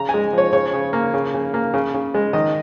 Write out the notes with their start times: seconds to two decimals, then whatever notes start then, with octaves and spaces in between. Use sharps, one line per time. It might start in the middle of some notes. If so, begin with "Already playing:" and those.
Already playing: C#3 A#5
0.09 G#5
0.14 G#3
0.33 F3 C#5
0.53 C#3 C#5
0.73 C#3
0.93 A#3
1.14 C#3
1.34 C#3
1.54 A#3
1.74 C#3
1.94 C#3
2.14 G#3
2.33 D#3 D#5